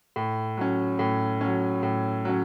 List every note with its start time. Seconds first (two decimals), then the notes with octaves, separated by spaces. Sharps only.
0.16 A2
0.57 F#3 C#4
0.99 A2
1.41 F#3 C#4
1.83 A2
2.25 F#3 C#4